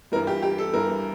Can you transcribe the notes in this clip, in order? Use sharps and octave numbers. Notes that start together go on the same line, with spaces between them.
G2 E3 G3 A#4
G4
G4
A4
G2 E3 G3 A#4